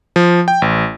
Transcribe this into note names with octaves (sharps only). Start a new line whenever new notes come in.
F3
G5
A1